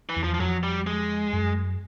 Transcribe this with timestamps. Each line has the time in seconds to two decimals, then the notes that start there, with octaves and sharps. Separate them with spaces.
0.09 E3
0.17 E2
0.24 F3
0.34 F3
0.40 F2 F#3
0.63 G3
0.87 G#3
1.33 F#2